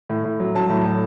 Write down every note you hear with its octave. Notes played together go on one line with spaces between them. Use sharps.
A2
A2
F#3
F#3 A5
A2
A2